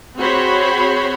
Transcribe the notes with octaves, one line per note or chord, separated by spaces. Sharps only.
C4 F#4 G#4 C5 C#5 B5